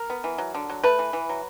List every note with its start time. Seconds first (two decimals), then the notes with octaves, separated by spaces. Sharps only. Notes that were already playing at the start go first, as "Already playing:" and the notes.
Already playing: A#4
0.10 B3
0.24 E3
0.38 F#3
0.55 D3
0.70 F#3
0.84 A3 B4
0.99 E3
1.13 E3
1.29 F#3